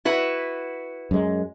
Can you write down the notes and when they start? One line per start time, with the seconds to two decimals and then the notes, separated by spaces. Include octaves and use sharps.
0.05 E4 F#4 B4
1.11 F#2 G#3